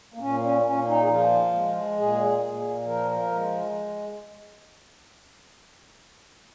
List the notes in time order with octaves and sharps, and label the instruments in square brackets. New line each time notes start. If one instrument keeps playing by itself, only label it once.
[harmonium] A#3
A#2 C#4
C#4
A#2 C#4
D#4
G#4
F3 F4
G#3
A#2 G#4
A#2
F3 A#4
A#4
G#3